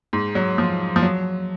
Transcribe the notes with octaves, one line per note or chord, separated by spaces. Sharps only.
G#2
F#3
F3
F3
F#3